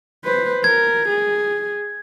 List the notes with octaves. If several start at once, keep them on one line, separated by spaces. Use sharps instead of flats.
B4 C5
A#4 G#6
G#4